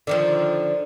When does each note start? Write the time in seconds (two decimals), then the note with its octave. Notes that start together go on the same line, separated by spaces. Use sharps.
0.07 D3 D#3 F3